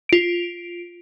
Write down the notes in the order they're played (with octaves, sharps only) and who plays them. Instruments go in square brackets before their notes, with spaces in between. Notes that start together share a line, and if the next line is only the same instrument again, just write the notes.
[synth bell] F4 D7